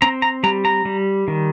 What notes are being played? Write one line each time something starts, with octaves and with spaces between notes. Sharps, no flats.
C4 A#5
A#5
G3 A#5
A#5
G3
D#3